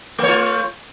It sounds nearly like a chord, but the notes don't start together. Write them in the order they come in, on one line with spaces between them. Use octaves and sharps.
A3 C#5 F4